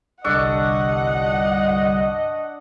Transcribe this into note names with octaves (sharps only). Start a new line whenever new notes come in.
G1 C2 G3 D4 A4 D#5 F#5 C#6